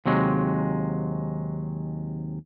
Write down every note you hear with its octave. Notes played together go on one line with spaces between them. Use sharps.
D#2 C3 F#3 G#3